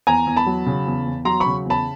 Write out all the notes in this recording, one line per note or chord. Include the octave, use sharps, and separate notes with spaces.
E2 G#5 A#5
E2
A5 B5
F#3
C#3
E2
E2
F#3 A#5 C6
B5 C#6
C#3
E2 A5 B5